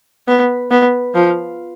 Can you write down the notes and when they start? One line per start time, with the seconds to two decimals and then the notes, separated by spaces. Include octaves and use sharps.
0.28 B3
0.71 B3
1.15 F3